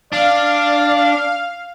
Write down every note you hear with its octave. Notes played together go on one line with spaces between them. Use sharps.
D4 D5 F5